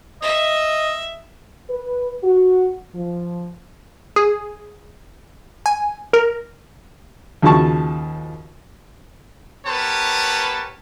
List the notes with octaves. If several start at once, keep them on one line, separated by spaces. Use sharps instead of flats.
D#5 E5
B4
F#4
F3
G#4
G#5
A#4
D#2 C#3 F3 F#4 A5 C#6
B3 G4 A#4 B4 C#5 A5